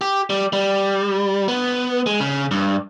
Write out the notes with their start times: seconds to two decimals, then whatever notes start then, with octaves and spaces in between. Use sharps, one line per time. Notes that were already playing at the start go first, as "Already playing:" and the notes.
0.01 G4
0.30 G3
0.53 G3
1.48 B3
2.06 G#3
2.21 C#3
2.51 G2